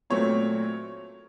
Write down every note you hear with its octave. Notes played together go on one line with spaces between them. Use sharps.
A#2 F#3 A3 C4 C#5